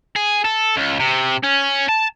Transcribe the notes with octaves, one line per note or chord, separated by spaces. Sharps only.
G#4
A4
C#2
C3
C#4
A5